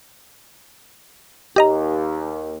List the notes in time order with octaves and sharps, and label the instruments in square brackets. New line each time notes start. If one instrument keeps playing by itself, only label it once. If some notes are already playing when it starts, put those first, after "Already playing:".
[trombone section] D#2 [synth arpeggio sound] G4 D#5 A#5